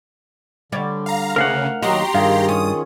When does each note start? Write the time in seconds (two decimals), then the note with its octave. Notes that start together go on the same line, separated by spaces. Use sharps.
0.72 D3 G3 C#5 D5
1.06 F5 A#5
1.36 D2 C#3 A#4 F5 F#5
1.82 D#2 F#3 F#4 G4 D#5 A#5 C6
2.14 G2 D#3 F4 G#4 F5
2.49 C#4 D#6